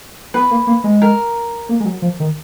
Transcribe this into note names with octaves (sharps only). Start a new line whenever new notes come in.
B3 B4
A#3
A#3
G#3
A#4
A#3
G#3
F#3
F3
D#3